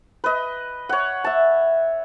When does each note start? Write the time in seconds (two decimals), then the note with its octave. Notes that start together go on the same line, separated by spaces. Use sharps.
0.24 B4 D#5
0.89 C#5 F#5
1.24 E5 A5